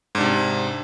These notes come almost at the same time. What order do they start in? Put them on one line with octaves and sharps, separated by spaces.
G#2 D4 C3